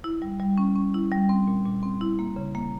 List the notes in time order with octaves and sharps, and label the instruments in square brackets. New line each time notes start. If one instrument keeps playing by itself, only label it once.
[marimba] E4
G3
G3
C#4
C#4
E4
G3
C4
A#2
A#2
C4
E4
A#3
C#3
A#3